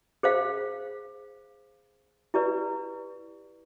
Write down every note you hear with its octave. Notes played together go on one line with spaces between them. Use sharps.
G#4 C5 F5
E4 G4 B4 D5